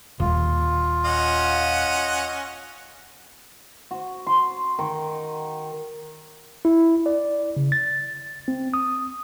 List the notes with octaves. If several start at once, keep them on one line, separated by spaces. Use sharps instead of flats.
D#1 F4
C#4 D#5 F#5
F#4
C6
D#3
E4
D5
C#3
A6
C4
D#6